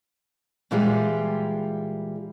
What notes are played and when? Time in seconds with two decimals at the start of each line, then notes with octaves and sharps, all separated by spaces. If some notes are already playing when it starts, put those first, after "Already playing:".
0.71 A#2 E3 G3 G#3 F4 G4